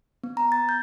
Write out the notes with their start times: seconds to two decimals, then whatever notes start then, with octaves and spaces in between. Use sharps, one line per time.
0.24 B3
0.37 A#5
0.52 A6
0.69 G6